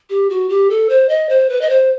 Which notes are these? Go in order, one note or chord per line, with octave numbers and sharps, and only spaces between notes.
G4
F#4
G4
A4
C5
D#5
C5
B4
D#5
C5